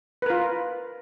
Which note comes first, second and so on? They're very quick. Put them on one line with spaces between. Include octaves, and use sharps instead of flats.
B4 A#4 F4